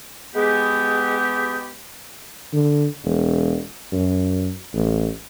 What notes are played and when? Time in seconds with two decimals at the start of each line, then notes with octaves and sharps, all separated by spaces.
0.35 G#3 B3 G4
2.53 D3
3.05 E1
3.93 F#2
4.73 A1